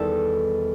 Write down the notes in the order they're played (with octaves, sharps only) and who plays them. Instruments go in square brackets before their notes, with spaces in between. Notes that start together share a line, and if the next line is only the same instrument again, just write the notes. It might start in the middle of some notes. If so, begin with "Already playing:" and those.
Already playing: [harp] E2 D#3 G3 A4